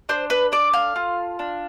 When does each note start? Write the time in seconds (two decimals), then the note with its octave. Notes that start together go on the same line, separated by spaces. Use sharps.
0.09 D4 C5
0.30 B4
0.52 A4 D5
0.73 F5
0.96 F4
1.39 D4